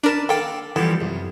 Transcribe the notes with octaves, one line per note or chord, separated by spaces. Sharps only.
D4 A#4 B4 A5
A#3 A4 D5 F5 G5
E3 F3 G3 B3 G4 A4
C2 F#2